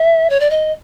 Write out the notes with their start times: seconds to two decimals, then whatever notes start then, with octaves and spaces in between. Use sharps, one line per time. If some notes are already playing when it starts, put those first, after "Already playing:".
Already playing: E5
0.30 C#5
0.40 D5
0.50 D#5